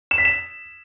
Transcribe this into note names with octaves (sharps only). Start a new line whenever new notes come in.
E7
B6
E7